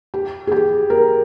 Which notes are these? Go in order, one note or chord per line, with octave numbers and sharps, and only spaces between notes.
G4
G#4
G4
A#4